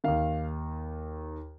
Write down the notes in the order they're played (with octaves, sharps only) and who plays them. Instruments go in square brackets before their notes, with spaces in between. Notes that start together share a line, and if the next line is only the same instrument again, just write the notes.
[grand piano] D#2 D#3 F5